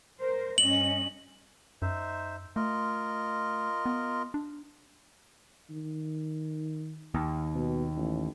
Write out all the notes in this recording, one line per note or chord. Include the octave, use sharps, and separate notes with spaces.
A#4 C5
G2 C#4 D#5 F#7
F#2 D#4 C5 E5
A3 F4 A#4 D#5
B3
D4
D#3
D#2
B2
A1